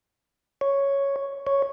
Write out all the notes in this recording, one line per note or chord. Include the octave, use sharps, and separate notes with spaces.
C#5
C#5